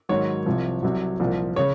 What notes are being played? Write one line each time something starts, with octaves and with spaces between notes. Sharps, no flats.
G#2 D#3 F#3 C#5
C2 C3 F3
C2 C3 F#3
C2 A#2 F3
C#3 C#5